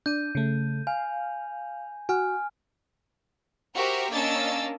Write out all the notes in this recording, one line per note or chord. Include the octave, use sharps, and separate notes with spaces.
D4 G6 D#7
C#3 A3
F5 G#5
F#4 G#5 F6
F#4 G4 A#4 C5 E5
A#3 C#4 D4 D#5 E6 A6